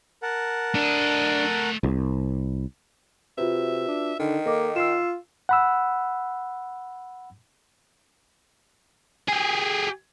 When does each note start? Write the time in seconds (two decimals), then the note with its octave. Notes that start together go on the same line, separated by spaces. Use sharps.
0.23 A#4 F#5 A5
0.75 A3 D4 D#5
1.83 C2
3.38 C3 F4 F#4 B4 E5
3.88 D4
4.19 D3 D#3 D#4
4.46 A#3 A4 D#5 D6
4.76 F4 E6 C7 E7
5.49 F#5 B5 E6
9.28 G4 G#4